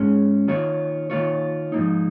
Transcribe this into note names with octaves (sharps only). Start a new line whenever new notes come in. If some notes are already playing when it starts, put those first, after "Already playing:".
Already playing: G#2 G#3 C#4
D#3 A#3 F4 C#5
D#3 A#3 F4 C#5
G#2 F3 A#3 D#4